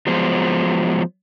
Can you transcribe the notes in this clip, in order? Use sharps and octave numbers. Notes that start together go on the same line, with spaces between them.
F3 F#3 G#3 B3 C5